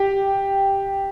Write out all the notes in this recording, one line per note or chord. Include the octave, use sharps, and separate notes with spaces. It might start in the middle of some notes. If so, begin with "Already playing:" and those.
Already playing: G4